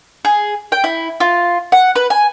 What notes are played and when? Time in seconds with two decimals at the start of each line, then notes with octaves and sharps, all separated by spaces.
0.25 G#4
0.72 G5
0.84 E4
1.20 F4
1.72 F#5
1.96 B4
2.10 G#5